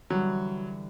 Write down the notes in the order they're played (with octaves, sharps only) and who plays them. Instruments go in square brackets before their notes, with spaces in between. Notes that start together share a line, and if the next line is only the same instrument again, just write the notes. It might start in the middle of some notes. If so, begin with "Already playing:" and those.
[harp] D3 E3 G3 [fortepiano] F#3